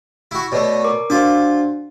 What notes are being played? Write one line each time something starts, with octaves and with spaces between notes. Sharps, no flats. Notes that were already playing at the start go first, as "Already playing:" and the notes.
E4 F#4
B2 A3 C#5 D5
A#4 D6
D4 F4 F#4 C5 D6